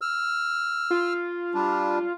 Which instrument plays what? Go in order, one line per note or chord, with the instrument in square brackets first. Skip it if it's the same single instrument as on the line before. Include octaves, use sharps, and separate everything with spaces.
[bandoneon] E6 F6
[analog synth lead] F4
[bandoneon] G3 D4